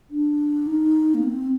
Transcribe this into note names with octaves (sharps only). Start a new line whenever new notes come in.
D4
D#4
A#3
C4